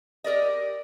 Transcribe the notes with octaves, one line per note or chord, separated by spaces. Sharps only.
G4 A#4 D5 D#5